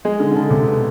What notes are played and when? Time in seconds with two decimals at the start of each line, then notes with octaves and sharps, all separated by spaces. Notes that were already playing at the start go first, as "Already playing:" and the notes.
0.05 G#3 G#4
0.20 D3
0.31 D3
0.36 C#3 A4
0.50 C3
0.66 B2